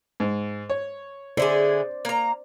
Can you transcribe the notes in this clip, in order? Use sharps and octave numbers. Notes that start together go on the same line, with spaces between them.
G#2
C#5
D3 E4 G#4 C5 D5
A#3 A#5